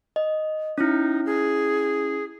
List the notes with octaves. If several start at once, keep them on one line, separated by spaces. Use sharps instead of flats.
D#5
C#4 D#4 E4
G#4